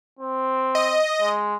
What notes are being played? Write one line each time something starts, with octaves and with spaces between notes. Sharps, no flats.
C4
D#5
G#3